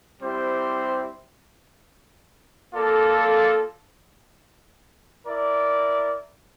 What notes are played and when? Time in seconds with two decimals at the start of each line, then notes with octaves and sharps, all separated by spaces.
0.19 G3 C4 E4 G4 C5
2.73 A#3 F4 A4 D5
5.26 E4 A#4 D5